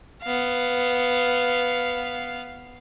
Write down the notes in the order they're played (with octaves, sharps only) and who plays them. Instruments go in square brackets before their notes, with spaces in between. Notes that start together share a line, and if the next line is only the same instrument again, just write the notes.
[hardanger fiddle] B3 F5